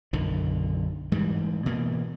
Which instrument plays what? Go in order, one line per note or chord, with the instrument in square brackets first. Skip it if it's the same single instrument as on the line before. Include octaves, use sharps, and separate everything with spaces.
[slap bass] B1 F#2 D3 D#3
G#2 E3 G3
B2 E3 A#3